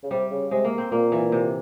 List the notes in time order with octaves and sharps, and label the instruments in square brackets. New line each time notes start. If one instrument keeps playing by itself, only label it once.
[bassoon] C#3
[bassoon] C3 [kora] G3
[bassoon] C#3
[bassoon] C3 [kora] G#3
[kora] A#3
C4
[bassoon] A#2 [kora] A#3
[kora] E3
C3